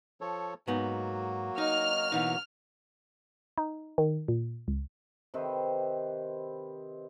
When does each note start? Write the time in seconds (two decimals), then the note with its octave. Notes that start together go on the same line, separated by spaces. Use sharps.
0.21 F3 A4 C#5
0.67 G#2 F#3 A#3 B3 D#4 F#4
1.58 D#4 D#5 F6
2.12 B2 E3 D#4 F#5
3.58 D#4
3.98 D#3
4.28 A#2
4.68 C#2
5.34 C3 D#3 C4 B4